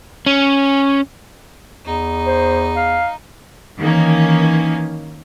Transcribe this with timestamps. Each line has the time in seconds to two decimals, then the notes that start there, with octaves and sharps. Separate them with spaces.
0.26 C#4
1.86 E2 D#4
2.27 C5
2.76 F5
3.78 D#3 E3 A#3 C#4